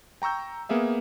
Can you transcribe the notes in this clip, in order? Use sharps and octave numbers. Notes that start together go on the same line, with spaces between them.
G5 A#5 C#6 E6 G6
A#3 B3 G#4 E5 F5